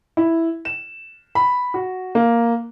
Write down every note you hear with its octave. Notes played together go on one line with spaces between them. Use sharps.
E4
E7
B5
F#4
A#3